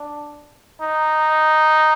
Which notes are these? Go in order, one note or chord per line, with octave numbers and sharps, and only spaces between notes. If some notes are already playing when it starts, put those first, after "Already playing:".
Already playing: D4
D#4